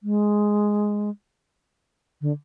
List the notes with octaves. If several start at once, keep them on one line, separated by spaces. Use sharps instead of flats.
G#3
D3